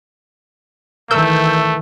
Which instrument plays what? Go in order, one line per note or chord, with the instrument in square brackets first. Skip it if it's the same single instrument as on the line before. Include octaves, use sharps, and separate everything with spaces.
[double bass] D#3 E3 [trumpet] A3 [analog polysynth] A#4 E6 G6